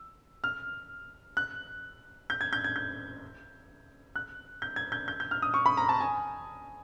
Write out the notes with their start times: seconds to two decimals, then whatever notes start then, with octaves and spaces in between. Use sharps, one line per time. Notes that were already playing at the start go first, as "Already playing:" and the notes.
Already playing: E6
0.44 F6
1.37 F#6
2.30 G6
2.41 G#6
2.53 G6
2.64 G#6
2.76 G6
4.16 F#6
4.62 G6
4.76 G#6
4.92 G6
5.08 G6
5.20 G6
5.31 F6
5.42 D#6
5.54 C#6
5.66 B5
5.77 A#5
5.89 A5
6.00 G#5